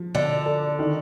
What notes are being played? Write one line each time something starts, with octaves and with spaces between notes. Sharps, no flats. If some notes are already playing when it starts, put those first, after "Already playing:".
Already playing: F3
D3 D5
A4
D#3